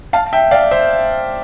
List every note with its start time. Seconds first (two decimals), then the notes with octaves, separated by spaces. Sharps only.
0.13 F5 A5
0.33 E5 G5
0.51 D5 F5
0.71 C5 E5